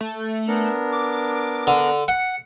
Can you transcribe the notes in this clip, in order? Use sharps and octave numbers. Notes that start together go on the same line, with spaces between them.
A3
B3 D4 A#4
D6
D3
F#5 C#7